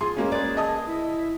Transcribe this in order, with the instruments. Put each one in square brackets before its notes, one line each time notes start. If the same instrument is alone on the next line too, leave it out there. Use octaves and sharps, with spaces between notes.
[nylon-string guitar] F4 G#4 [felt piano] C6
[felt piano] G#3 A#3 C#4
[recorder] G#4 [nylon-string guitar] B4 D5
[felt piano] D#5 A5 D#6
[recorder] E4